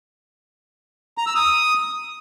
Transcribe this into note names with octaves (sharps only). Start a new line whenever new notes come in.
A#5
E6
D#6